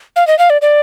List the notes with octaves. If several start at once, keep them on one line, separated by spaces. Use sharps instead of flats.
F5
D#5
F5
D5
D5